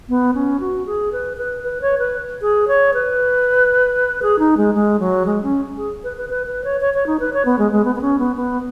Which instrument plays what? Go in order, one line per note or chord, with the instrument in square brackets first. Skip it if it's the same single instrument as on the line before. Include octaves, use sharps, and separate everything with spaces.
[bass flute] B3
C#4
F#4
G#4
B4
B4
B4
C#5
B4
G#4
C#5
B4
G#4
D#4
G#3
G#3
F#3
G#3
C#4
G#4
B4
B4
B4
B4
C#5
C#5
C#5
D#4
B4
C#5
B3
G#3
G#3
B3
B3
C#4
B3
B3